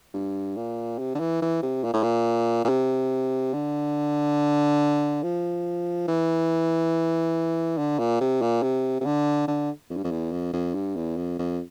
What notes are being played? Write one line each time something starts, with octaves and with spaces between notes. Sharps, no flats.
G2
A#2
C3
D3
E3
E3
C3
A#2
A2
A#2
A#2
C3
D3
F3
E3
D3
A#2
C3
A#2
C3
C3
D3
D3
F2
G2
F2
E2
F2
F2
G2
E2
F2
F2